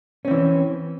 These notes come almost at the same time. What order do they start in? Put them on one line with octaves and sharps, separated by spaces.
C#4 C4 E3